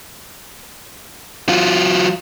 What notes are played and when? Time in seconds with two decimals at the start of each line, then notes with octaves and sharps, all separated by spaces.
1.49 F#3 F4